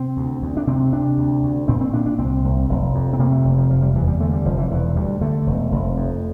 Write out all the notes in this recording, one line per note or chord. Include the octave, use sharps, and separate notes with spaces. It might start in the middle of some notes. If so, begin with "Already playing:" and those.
Already playing: C3 C4
D2
D2
D4
C3 C4
C3 D4
D2
D2
A#2 C4
C4
A#2 D4
D4
C2 C4
C2
F1
F2
C4
C3 A#3
A3
F1
F3
F1 F3
G3
E2 E3
G3
D3 A3
G3
F1 F3
E3
E1 E3
D2 G3
D3 A3
E1
F1
F2